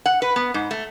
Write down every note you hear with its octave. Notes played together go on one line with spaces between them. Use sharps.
F#5
B4
B3
G#2
A3